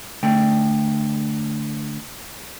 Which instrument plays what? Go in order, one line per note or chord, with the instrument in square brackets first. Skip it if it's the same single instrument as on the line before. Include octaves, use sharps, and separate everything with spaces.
[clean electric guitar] D3 A3 G5